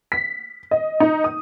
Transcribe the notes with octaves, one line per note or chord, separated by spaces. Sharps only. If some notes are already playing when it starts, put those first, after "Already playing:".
B6
D#5
D#4
D#6